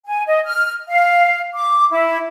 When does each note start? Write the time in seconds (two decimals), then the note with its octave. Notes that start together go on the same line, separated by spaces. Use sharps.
0.06 G#5
0.27 D#5
0.45 F6
0.89 F5
1.54 D6
1.90 E4